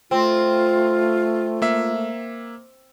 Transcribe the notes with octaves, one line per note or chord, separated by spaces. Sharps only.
A3 C4 F4
A#3 E5